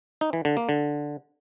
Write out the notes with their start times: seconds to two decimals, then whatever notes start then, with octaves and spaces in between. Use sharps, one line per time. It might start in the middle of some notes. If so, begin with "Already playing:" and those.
0.21 D#4
0.33 E3
0.45 D3
0.57 A#3
0.69 D3